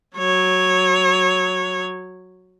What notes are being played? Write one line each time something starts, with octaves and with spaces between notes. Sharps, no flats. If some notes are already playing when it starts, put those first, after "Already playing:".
F#3 C#5